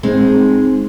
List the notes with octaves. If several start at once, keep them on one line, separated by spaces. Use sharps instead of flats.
G#3 C4 D#4